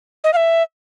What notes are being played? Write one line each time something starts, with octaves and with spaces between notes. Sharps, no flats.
D#5
F5
E5